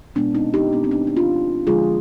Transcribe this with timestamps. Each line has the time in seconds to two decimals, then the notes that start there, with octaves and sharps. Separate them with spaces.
0.15 B2 G#3 B3 D4
0.35 C4 D#4
0.54 D#4 G4
0.73 B3 D4
0.84 C4
0.91 B3 D4
1.07 D#4
1.17 D4 F4
1.67 D3 F3 G#3 F4 G#4